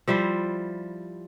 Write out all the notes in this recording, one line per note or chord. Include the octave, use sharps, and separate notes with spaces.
F3 G3 E4 C5